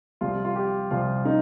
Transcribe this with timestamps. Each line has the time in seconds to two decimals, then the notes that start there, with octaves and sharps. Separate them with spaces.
0.21 C2 C3 F3 F4
0.45 F4
0.55 G4
0.91 C2 C3 F3 F4
1.25 D#4